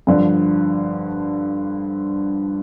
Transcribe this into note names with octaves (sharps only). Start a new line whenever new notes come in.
G2 D3 F3